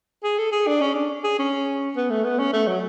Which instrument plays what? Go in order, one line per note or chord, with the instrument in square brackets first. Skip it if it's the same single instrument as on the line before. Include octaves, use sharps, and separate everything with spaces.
[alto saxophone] G#4
A4
G#4
D4
C#4
D4
G#4
C#4
B3
A3
B3
C#4
A3
F#3